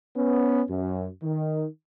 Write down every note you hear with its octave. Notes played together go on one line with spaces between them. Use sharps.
B3 C#4
F#2
D#3